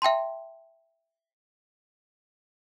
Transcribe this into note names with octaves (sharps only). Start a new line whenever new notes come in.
E5 G5 A5 C6